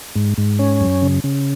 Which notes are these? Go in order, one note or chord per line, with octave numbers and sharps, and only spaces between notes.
G#2
G#2
C#4
F#2
C#3
C#3